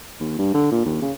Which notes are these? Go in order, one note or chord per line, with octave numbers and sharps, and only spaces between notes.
D#2
G2
D3
A#2
D#2
C#3